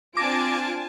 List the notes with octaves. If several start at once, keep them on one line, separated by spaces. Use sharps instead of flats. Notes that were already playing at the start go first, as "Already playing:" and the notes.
C4 D4 F4 G#5 A5 D6 A#6 D7